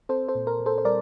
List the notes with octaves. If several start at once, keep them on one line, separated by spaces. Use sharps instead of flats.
C4 A4 C5
A4 C5
A#2
A#4
A#2
A4 C5
C5
G3 A#4 D5